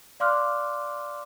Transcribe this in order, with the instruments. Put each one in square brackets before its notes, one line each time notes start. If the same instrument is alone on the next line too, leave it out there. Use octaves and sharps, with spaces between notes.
[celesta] D5 F5 C6 D6 F6 F#6